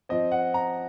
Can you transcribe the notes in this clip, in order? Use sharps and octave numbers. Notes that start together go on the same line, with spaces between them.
F3 C4 D#5
F#5
A#5